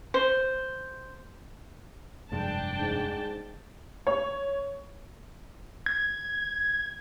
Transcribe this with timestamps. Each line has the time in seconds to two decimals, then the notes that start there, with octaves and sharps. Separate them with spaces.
0.14 C5
2.32 F1 G2 G#3 D4 G5 A5
2.80 G#2
4.07 C#5
5.86 G#6